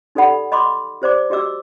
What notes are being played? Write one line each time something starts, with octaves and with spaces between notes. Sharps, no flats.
D#4 G4 A4 D5 F#5 B5
D#5 B5 C6 D6 D#6
G4 C5 D5 D6
F#4 G4 D#5 D6 E6